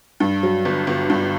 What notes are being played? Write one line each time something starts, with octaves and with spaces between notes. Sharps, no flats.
G2
F#3
G1
G1
G2